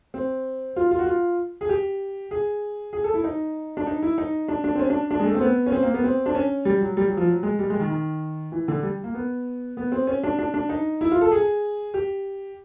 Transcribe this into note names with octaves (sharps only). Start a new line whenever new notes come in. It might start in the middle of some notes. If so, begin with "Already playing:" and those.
C4
F4
F4
F#4
F4
G#4
G4
G#4
G#4
A4
E4
D#4
D4
D#4
E4
D#4
D4
D4
C4
C#4
D4
D4
G#3
A3
C4
B3
C#4
C4
A#3
B3
C4
D4
C#4
G3
F#3
G3
F#3
F3
F#3
G#3
G3
G#3
D#3
D#3
E3
D3
G3
A#3
B3
B3
C4
C#4
D4
D4
D4
D#4
E4
F4
A4
G#4
G4